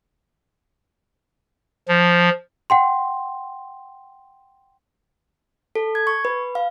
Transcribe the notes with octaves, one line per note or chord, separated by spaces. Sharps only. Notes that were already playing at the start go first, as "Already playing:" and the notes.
F3
F#5 G5 C6
A4
G#6
C#6
B4
F5